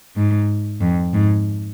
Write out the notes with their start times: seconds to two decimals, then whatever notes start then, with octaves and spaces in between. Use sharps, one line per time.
0.16 G#2
0.81 F2
1.13 G#2